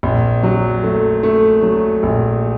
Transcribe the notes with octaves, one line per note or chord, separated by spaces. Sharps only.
A#1
F#3
A3
A3
F#3
A#1